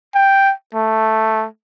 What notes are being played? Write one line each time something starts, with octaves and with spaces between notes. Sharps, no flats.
G5
A3